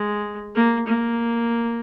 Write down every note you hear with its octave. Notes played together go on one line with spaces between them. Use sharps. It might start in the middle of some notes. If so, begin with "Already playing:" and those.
Already playing: G#3
A#3
A#3